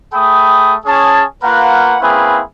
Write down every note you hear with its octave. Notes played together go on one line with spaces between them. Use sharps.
A3 G#4 G5 B5 D#6
C#4 G#4 A5
A#3 F4 A#4 B4 F#5
A#3 C4 C#4 E4 G#4 B4